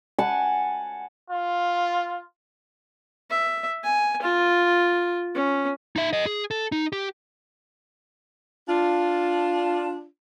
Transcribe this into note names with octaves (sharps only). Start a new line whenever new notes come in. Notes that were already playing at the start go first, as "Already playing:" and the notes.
F#5 G#5 A5 B5
F4
E5
G#5
F4
C#4
D#4 E5
A4 D#5
G#4
A4
D#4
G4
D4 F4